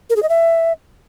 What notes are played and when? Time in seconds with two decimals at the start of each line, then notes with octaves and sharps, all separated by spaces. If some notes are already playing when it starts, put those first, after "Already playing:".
0.10 A#4
0.16 G#4
0.23 D#5
0.29 E5